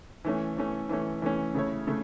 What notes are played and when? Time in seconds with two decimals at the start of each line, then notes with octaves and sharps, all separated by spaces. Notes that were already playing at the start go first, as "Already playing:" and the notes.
0.25 E3 A3 C#4
0.57 E3 A3 C#4
0.89 E3 A3 C#4
1.22 E3 A3 C#4
1.55 C#3 A3 E4 C#5
1.87 C#3 A3